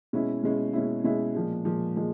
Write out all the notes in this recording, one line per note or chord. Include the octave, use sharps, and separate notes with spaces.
B2 G#3 C#4 E4
B2 G#3 C#4 E4
B2 G#3 C#4 E4
B2 G#3 C#4 E4
A#2 F3 G#3
A#2 F3 G#3
A#2 F3 G#3